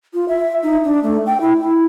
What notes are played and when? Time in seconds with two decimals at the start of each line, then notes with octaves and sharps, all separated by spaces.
0.14 F4
0.28 E5
0.63 D#4
0.84 D4
1.03 A3
1.26 G5
1.41 E4
1.60 E4